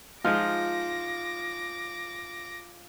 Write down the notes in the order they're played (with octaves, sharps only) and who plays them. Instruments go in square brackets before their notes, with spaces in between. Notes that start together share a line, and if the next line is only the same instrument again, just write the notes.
[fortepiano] F3 G#3 D#4 [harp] F4 [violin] D6 A#6